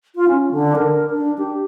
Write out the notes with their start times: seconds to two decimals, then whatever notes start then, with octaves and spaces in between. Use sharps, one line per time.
0.16 F4
0.28 C#4
0.51 D3
0.76 A#4
1.10 D4
1.38 G4